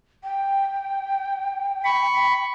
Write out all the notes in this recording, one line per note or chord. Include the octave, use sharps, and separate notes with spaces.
G5
B5 C#6